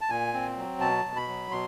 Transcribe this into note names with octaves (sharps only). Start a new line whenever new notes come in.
A5
A#2 G#5
C4
F#3
B2 A5
B2
B5
F#3
B2 C6